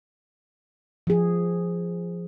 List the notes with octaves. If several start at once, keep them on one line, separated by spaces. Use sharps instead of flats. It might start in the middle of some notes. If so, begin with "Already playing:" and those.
F3 G#4